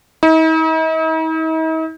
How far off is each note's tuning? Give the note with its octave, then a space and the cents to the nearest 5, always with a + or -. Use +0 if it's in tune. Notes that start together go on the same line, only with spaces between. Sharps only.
D#4 +45